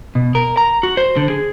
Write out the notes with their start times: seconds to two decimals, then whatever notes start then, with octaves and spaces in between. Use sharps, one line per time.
0.15 B2
0.35 A#4
0.57 A#5
0.83 F#4
0.97 C5
1.17 D3
1.30 G#4